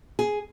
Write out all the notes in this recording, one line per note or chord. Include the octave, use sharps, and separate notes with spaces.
G#4